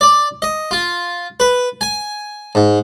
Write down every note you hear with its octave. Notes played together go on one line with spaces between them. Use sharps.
D5
D#5
F4
B4
G#5
G#2